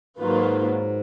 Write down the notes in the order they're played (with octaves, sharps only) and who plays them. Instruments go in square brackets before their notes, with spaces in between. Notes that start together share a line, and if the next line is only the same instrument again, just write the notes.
[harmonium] G#2 [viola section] D#3 F#3 A#3 F4 B4